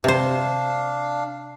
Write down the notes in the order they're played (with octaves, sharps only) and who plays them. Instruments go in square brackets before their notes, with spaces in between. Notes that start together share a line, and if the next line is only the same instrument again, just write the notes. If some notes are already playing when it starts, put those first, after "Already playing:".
[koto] C3 C5 [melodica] D4 F5